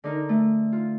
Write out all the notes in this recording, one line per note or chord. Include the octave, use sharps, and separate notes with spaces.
D3 D#4 A#4
A3
F4